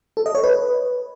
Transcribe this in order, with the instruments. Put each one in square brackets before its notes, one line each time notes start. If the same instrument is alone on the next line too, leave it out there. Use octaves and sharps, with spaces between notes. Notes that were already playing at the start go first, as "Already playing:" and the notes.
[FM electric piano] A4
D#5
C#5
B4